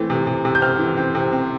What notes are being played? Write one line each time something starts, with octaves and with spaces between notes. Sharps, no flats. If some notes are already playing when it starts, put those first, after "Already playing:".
Already playing: E3 A3 C4
C3
C3
C3
G6
C4 F6
E3
C4
C3
C4